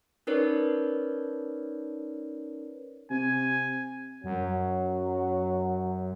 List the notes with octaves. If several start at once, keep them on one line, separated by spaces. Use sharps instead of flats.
C#4 D#4 A#4 B4 C#5 D5
C3 G#5
F#2 F#3